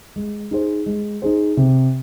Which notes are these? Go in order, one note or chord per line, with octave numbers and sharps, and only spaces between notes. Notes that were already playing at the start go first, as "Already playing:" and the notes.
G#3
D#4 G#4 C5
G#3
D#4 G#4 C5
C3